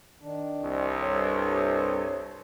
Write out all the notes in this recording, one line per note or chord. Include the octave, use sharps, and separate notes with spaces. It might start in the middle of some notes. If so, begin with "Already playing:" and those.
D#3 D4
C2
G2 A4 C5 C#5